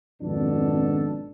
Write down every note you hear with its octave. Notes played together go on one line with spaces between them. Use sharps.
G#1 F2 B2 D4 A4